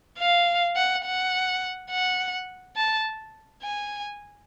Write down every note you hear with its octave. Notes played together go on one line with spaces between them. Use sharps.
F5
F#5
F#5
F#5
A5
G#5